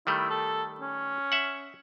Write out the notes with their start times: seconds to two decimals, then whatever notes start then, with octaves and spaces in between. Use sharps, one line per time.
0.07 D#3 G3 A3 E4
0.30 A4
0.80 C#4
1.32 E5 F#5